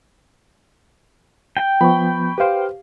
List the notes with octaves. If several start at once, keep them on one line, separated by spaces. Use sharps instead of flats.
G5
F3 B3 B5 C#6
G4 B4 C5 F5